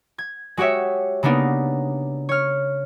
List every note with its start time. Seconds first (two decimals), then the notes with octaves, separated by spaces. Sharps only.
0.18 G#6
0.57 G#3 F#4 G4 C#5 E5
1.23 C#3 A#3 B3 D4 D#4
2.29 C#5 F6